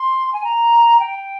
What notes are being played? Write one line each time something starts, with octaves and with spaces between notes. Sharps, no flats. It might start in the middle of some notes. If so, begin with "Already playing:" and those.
Already playing: C6
G#5
A#5
G5